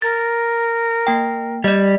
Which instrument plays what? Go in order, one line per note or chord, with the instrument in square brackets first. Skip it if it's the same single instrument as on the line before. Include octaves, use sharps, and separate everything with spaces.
[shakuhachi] A#4 [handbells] A6
[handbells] A#3 G5
[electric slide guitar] G3 [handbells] D5 D#5